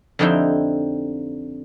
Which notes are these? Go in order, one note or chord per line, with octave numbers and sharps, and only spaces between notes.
F2 D3 C4 D#4 E4 G4